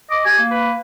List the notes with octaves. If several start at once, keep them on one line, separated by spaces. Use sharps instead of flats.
D#5 D6
G4 G#5
A#3
B4